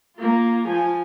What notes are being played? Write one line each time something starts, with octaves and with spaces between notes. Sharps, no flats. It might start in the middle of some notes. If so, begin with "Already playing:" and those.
A#3 F4
F3 G#5